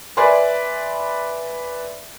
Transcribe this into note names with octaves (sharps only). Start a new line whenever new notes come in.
B4 D5 E5 G#5 C6